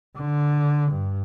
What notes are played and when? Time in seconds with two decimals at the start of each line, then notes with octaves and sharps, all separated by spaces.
0.17 D3
0.91 G2